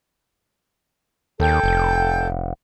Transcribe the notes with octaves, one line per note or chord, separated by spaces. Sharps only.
D#2 A4 G5 G6
F1